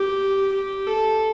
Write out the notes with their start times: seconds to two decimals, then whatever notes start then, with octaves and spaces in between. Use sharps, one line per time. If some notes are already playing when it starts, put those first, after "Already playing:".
Already playing: G4
0.52 G4
0.86 A4